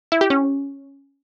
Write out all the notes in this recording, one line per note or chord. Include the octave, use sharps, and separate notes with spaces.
E4
G4
C#4